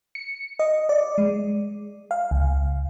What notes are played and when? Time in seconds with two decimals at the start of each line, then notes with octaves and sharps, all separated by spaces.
0.15 C#7
0.59 D#5
0.89 D5
1.18 G#3
2.11 F5
2.31 C#2